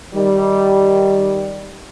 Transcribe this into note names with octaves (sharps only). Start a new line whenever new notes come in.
D#3 G3